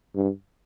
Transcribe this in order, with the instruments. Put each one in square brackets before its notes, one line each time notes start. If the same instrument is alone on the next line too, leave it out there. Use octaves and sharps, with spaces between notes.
[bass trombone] G2